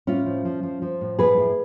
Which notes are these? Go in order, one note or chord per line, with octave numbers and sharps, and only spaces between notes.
A2 C#4 F4
F3
F3
F3
F3
A2
F3 G#4 B4
A2